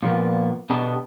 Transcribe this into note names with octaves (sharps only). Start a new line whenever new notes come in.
A#2 F3 A#3 B3
B2 D3 B3 G4 D#5 A5